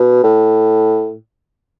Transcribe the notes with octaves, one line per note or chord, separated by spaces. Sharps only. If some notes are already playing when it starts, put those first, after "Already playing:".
Already playing: B2
A2